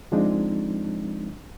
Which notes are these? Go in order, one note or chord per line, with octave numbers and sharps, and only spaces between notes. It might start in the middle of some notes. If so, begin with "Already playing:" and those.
D3 F3 G#3 C4 D4 D#4